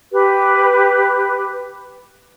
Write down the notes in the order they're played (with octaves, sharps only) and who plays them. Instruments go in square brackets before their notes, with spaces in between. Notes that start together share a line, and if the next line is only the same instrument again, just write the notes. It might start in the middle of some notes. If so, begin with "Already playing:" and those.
[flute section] G4 B4